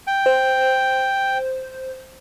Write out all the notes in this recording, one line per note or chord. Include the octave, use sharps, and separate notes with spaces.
G5
C5